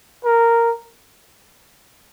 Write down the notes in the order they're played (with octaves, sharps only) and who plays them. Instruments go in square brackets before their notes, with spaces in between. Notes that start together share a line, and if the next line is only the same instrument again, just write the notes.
[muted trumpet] A#4